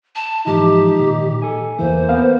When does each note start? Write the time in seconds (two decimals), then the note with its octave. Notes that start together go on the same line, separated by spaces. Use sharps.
0.15 A5
0.47 G#2 E3 F3 D#4 G4
1.00 A#2 D#3
1.42 A4 G#5
1.79 E2 E3 A#3 C5
2.09 B3 F5